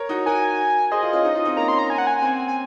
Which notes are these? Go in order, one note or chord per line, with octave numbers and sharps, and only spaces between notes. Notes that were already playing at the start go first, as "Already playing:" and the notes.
Already playing: A#4 C#5
D#4 F#4
F#4 A#4 G#5
G#4 C5 D#5
F4 G#4
C#4 F4
D#4
F4
C4 D#4
A#3 C#4 A#5
C6
A#5
G#5
F#5
G#5
C4
G#5